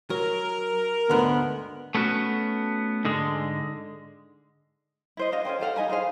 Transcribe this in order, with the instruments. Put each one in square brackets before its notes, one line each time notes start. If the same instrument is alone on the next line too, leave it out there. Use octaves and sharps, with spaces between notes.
[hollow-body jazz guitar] F#3 [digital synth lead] A#4
[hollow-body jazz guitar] D2 G#2 D3 [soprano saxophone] B3
[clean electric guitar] A3 B3 C#4 F#4
G#2 D3 G#3
[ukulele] E4 C5 D#5
D4 F#4 D#5 F5
C#4 A4 C5 G5
G4 A4 F5 F#5
D#4 D#5 G#5 B5
D#4 G#4 C5 F5